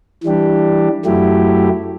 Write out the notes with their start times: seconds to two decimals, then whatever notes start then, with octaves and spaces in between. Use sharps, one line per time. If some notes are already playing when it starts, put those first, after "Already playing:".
0.24 E3 G3 D4 G4
1.05 F#2 F#3 A3 E4 G4